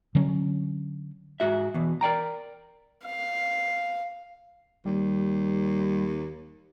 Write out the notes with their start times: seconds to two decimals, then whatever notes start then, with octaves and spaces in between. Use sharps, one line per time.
0.15 D3 F#3 C#4
1.40 G#2 F#4 E5
1.74 E2 B2
2.01 A#4 D5 G5 A#5
3.05 F5
4.86 D#2 G3